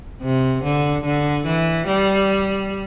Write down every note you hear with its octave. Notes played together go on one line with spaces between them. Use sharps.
C3
D3
D3
E3
G3